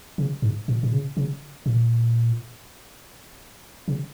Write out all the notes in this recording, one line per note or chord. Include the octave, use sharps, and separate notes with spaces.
C#3
G#2
A#2
A#2
C#3
C#3
A#2
C#3